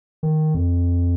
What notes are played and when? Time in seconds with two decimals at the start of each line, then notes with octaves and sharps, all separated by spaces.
0.23 D#3
0.54 F2